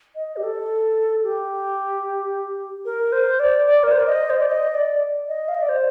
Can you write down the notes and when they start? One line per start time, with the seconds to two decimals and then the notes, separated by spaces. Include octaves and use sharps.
0.15 D#5
0.37 G4
0.43 A4
1.23 G4
2.85 A#4
3.12 C5
3.39 D5
3.67 D5
3.83 A#4
3.91 C5
3.99 D5
4.07 D#5
4.30 C5
4.39 D5
4.47 D#5
4.74 D5
5.28 D#5
5.48 F5
5.55 D#5
5.62 D5
5.69 C5